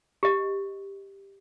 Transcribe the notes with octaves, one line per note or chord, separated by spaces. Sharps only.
G4 D#5